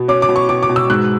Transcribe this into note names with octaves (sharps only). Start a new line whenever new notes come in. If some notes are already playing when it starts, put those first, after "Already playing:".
Already playing: B2
C#4 D6
D6
B2
C#6
B2 D6
D6
B2
E6
G#2 F#6